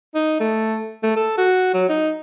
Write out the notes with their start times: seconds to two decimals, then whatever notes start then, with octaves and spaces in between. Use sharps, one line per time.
0.15 D#4
0.40 A3
1.03 A3
1.16 A4
1.38 F#4
1.74 F#3
1.89 D#4